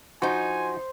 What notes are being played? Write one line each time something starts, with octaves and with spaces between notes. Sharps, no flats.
F3 D#4 F#4 C5 G#5